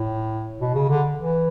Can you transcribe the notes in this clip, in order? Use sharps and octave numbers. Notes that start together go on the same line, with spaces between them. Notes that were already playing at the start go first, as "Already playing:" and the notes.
Already playing: A2
B2
C#3
D3
E3